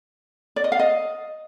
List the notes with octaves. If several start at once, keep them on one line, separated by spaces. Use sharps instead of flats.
D5
D#5
F5
D#5